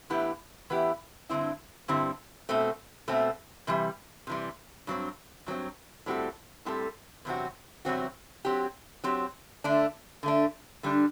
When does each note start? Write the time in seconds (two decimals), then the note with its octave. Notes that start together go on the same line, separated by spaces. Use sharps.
0.10 A2 E3 B3 E4 G4
0.70 A2 E3 B3 E4 G4
1.29 G2 D3 G3 C4 E4
1.88 G2 D3 G3 C4 E4
2.49 B2 A3 C4
3.08 B2 A3 C4
3.67 C3 E3 G3
4.27 C3 E3 G3
4.87 G2 F#3 C4
5.46 G2 F#3 C4
6.06 A2 G3 C4 F#4 A4
6.65 A2 G3 C4 F#4 A4
7.25 E2 C3 F#3 C4 F#4
7.85 E2 C3 F#3 C4 F#4
8.45 F#3 C4 G4
9.04 F#3 C4 G4
9.64 D3 A3 D4
10.23 D3 A3 D4
10.83 D3 G3 D4